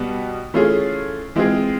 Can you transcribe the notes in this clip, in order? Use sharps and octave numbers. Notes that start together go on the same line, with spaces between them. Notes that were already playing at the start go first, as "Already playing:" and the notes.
Already playing: B2 G3 B3
E3 A3 C#4 F4 G#4
E3 G#3 C4 F4 G#4